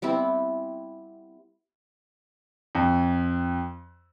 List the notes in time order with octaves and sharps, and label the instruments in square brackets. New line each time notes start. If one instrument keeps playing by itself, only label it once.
[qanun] G3 B3 C4 E4
[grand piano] F2